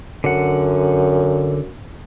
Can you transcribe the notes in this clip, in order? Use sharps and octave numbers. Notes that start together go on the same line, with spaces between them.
F#2 D3 F#5